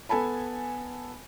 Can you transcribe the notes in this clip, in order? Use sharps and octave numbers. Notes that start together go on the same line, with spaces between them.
B3 A4 G#5 A5 B5